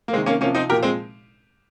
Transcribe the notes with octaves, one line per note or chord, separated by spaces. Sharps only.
A#3
C3 D#3 G#3 C4
A#3 C#4
C3 F3 A#3 C#4
C4 D#4
A#2 F3 G4 A#4
G#3 C4